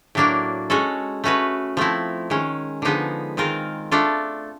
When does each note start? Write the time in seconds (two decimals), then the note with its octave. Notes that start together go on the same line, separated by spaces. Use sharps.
0.15 A2 F#3 A#3 D4
0.70 G#3 C#4 F#4 A4
1.24 A3 C#4 F#4 B4
1.77 F3 A3 C4 E4
2.30 D#3 G#3 C#4
2.82 D3 F3 G#3 B3 D#4
3.37 D#3 G#3 C4 F4 A#4
3.92 A3 D4 F4 A4